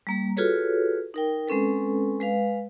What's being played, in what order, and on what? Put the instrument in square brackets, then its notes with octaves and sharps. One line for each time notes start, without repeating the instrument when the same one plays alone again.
[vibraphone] G3 A#3 A#5
F4 F#4 G#4 A4 B4 C#5
D#4 A#4 G5
G#3 C4 C#4 A4 B4
G#3 B4 F5